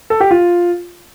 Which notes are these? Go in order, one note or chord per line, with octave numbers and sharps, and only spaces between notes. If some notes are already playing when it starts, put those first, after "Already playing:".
A4
G4
F4